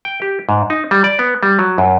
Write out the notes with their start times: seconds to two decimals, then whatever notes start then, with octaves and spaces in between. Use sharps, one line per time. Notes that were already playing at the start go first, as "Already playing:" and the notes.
0.05 G5
0.22 G4
0.49 G#2
0.70 D#4
0.91 G3
1.04 D5
1.19 B3
1.43 G3
1.59 F#3
1.78 F#2